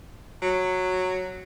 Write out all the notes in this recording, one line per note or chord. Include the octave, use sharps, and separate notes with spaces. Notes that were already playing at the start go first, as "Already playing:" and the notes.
F#3